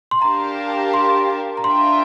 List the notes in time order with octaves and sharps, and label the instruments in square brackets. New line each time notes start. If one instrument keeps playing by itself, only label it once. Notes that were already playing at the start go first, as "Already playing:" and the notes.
[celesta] C6
[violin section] D4 G4 A#4 F5 A5 [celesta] A#5
[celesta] C6
A#5
[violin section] D4 F4 A#4 E5 G5 [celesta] C6